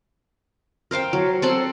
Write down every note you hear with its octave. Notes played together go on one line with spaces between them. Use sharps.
A#4 C5 F5 G5
F#3
C4 A4 F#5 C6